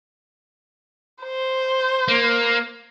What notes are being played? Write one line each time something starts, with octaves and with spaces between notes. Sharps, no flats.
C5
A#3